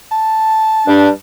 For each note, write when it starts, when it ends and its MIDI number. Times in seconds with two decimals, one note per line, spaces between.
0.12 1.13 81
0.87 1.09 43
0.87 1.09 55
0.87 1.09 62